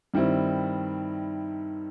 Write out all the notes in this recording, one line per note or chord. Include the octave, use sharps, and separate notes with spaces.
G2 D#3 G3 C4 E4